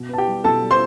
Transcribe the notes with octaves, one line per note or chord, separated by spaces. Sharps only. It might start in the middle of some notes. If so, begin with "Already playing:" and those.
Already playing: B2
B3 A5
G4 G5
G3
B2 A4 A5
G3
C5 C6